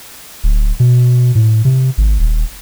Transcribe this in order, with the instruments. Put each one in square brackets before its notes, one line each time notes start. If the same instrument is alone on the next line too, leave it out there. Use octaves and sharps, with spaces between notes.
[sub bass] D1
B2
A2
C3
G#1
D#1